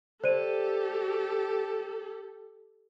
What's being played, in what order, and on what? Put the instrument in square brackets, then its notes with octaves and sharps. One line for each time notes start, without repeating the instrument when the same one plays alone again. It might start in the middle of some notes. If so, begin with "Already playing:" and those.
[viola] G4 A4 [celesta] C5 D5 D#7